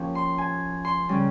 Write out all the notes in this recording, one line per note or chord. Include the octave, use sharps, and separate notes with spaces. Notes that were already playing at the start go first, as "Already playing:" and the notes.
Already playing: F3 A#3 C#4 G4
C6
G#5
C6
C#3 G3 C#4